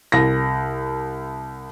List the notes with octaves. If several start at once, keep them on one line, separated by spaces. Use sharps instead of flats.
C2 A#6